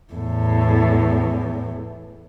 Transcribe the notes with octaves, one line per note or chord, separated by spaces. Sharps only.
E2 A2